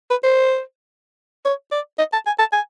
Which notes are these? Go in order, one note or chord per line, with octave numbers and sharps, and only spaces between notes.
B4
C5
C#5
D5
D#5
A5
G#5
A5
G#5